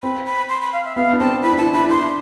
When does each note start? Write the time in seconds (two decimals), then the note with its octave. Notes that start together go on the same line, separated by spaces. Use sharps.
0.03 C4 B5
0.26 B5
0.49 C6
0.62 B5
0.73 F5
0.85 E5
0.96 B3 F5
1.13 D4
1.20 C4 A5
1.42 E4 B5
1.53 D4
1.58 E4 A5
1.73 D4 B5
1.84 E4
1.90 D4 C6